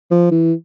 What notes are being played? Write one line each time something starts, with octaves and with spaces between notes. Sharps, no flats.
F3
E3